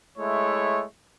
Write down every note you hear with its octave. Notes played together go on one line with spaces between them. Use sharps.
G#3 A3 E4 C#5